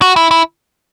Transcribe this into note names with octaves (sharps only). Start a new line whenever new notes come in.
F#4
E4
E4